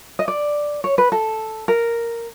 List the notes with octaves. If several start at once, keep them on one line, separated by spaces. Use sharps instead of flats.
D#5
D5
C#5
B4
A4
A#4